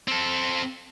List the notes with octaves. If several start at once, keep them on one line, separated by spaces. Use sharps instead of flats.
C4 A4